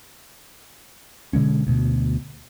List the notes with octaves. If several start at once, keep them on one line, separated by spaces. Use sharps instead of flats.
B2 D3 G#3 C#4
D2 B2